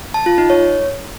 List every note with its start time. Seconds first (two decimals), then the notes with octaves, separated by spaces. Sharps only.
0.14 A5
0.26 F4
0.38 D#4
0.50 C#5